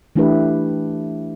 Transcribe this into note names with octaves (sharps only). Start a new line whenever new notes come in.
E3 A3 D4 E4 G4 B4